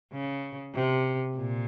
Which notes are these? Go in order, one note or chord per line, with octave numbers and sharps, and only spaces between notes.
C#3
C3
A#2